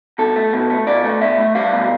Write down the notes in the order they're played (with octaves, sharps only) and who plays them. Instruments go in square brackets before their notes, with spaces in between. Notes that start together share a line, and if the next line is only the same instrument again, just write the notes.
[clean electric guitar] B2 A4
A3
B2
A3
B2 D5
A3
B2 E5
A3
G3 F5
B2